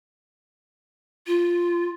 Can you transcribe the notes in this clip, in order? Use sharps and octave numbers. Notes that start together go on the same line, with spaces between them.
F4